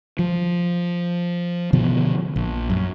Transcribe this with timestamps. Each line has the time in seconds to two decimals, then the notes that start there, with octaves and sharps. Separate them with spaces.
0.19 F3
1.73 B2 D3 F3 B3
2.36 A#1
2.70 F#2